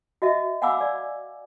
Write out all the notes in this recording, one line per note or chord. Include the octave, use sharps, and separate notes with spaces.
F#4 D#5 E5
F5 F#5 G#5 B5 D6 E6
D5